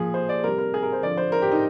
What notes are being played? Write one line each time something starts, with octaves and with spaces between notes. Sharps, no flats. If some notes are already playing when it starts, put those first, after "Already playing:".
Already playing: A#2 F3 G#4
C5
D5
C3 G3 A#4
A#4
G#4
A#4
C5
D3 F3 D5
C5
A#4
G4
D#4